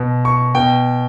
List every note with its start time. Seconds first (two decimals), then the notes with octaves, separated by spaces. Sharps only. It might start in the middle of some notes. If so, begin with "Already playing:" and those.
Already playing: B2
0.25 C#6
0.55 B2 G5